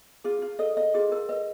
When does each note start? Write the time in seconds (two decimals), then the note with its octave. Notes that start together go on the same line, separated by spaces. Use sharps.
0.24 F4 G#4
0.42 F4
0.59 A4 D#5
0.77 D#5
0.94 F4 G#4
1.12 F4 A#4
1.29 B4 D#5